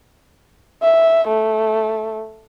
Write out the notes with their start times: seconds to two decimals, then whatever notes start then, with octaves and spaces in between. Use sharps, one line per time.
0.82 E5
1.28 A3